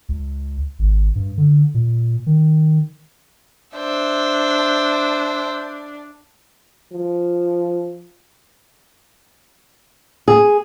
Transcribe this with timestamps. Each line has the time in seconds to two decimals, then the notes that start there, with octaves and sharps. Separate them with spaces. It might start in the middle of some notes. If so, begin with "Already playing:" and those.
0.09 C#2
0.79 G#1
1.15 G2
1.38 D3
1.74 A#2
2.26 D#3
3.76 D4 C5 E5
6.92 F3
10.28 G#4